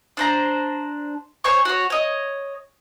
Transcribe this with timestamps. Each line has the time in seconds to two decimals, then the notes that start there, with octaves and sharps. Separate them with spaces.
0.17 D4 C5 A#5
1.44 C5 C#5 G#5 C#6
1.65 F#4 C#5
1.90 C#5 D#5